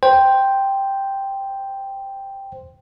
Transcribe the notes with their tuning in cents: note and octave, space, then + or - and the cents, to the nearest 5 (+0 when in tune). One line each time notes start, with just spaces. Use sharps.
C5 +0 G5 +0